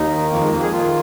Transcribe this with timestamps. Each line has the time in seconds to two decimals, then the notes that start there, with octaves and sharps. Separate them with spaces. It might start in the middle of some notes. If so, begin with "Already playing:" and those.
Already playing: D#2 D#4
0.10 D#3
0.31 F2 A#3
0.41 G#3
0.52 F2 A#3
0.62 G#4
0.73 D#3 F4